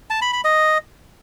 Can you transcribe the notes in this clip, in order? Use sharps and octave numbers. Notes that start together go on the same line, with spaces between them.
A5
B5
B5
D#5